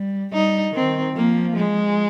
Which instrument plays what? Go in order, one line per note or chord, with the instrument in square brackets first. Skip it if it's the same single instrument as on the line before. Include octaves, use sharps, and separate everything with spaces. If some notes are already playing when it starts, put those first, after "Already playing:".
Already playing: [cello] G3
[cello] G3 [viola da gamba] D#4
[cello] D#3 [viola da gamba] C4
[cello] F3 [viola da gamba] A#3
[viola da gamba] G#3